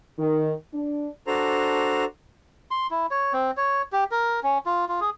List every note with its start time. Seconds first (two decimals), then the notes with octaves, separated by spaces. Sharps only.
0.18 D#3
0.73 D4
1.27 D4 F#4 A4 C5 A#5
2.71 C6
2.91 E4
3.11 C#5
3.33 C4
3.57 C#5
3.92 G4
4.11 A#4
4.43 C#4
4.66 F4
4.89 F4
5.01 G#4